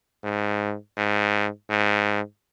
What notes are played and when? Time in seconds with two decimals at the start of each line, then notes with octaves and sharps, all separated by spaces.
0.24 G#2
0.97 G#2
1.70 G#2